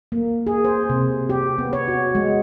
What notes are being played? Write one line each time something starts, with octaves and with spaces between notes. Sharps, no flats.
A#3
G#4
C5
C3
G4
B3
C#5
F#4
G#3